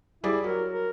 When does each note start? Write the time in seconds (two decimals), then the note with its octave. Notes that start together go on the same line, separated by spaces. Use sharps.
0.24 G3 E4 G#4 D5
0.44 F#3 A#4
0.70 A#4